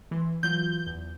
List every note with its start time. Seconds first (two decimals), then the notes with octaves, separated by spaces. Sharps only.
0.11 E3 C6
0.43 E3 F#3 F4 G6
0.87 E2